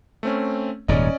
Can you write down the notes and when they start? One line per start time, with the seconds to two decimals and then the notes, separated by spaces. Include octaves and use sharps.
0.23 A3 C4 C#4
0.88 D#1 G#2 C#4 D5 D#5